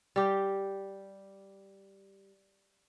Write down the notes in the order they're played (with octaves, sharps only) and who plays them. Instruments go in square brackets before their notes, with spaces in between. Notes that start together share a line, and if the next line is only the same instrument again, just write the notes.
[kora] G3 G4